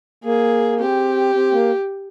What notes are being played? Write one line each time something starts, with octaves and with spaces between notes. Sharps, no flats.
A#3 G#4
C4 G4
C4
A#3